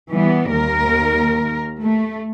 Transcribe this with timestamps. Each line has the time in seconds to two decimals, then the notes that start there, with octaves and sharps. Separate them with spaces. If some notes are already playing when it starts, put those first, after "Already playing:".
0.13 E3 G3 B3
0.53 D#2 A#4
1.82 A3